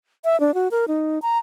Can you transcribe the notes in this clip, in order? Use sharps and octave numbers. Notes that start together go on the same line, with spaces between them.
E5
D4
F#4
A#4
D#4
A#5